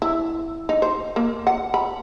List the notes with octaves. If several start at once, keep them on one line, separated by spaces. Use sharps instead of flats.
E4
D#4
C5
A#3
F#5
B5